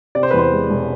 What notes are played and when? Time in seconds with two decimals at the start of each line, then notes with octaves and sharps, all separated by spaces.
0.15 C3 D5
0.23 C5
0.31 B4
0.34 E2 C5
0.52 G#3
0.70 E1